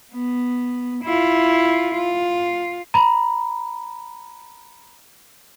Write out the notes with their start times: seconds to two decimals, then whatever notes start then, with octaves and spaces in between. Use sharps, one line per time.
0.13 B3
1.04 E4 F4
1.94 F4
2.94 A#5 B5